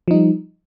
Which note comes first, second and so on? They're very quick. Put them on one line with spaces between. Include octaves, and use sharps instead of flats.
F3 D#4 G3